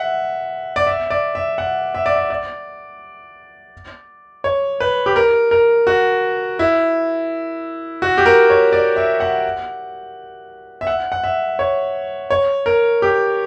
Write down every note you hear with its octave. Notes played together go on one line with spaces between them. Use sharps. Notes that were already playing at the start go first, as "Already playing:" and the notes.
Already playing: E5 F#5
D5
E5
D5
E5
F#5
E5
D5
E5
D5
C#5
B4
G4
A#4
A#4
F#4
E4
F#4
G4
A#4
C#5
D5
E5
F#5
E5
F#5
F#5
E5
C#5
C#5
A#4
G4